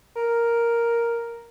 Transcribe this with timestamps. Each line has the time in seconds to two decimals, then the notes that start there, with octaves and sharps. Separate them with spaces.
0.16 A#4